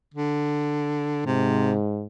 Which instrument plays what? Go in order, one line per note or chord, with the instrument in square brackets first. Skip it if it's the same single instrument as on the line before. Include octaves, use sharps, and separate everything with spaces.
[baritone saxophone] D3
[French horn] G#2 [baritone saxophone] C3